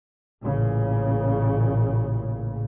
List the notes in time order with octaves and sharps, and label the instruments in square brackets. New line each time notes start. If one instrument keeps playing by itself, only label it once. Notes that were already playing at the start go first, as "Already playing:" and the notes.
[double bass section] A1 A#2 C#3